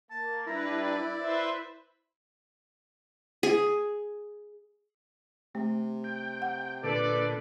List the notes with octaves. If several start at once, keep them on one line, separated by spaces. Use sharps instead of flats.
A#3 A5
G3 D4 E4 B4 A#5
D5
B4 C5 E5
G#4
C3 A3
G5
F#5
A#2 D3 A4 B4 D5